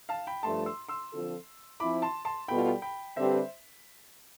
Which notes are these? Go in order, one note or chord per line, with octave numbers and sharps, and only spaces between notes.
F5 A5
G5 B5
G2 F3 A3 A5 C6
C6 E6
C6 E6
D3 F3 C4 F4 A4
F3 C4 E4 B5 D6
A5 C6
A5 C6
B2 G3 B3 F4 A4 G5 B5
G5 B5
D3 G3 C4 G4 B4 C5 E5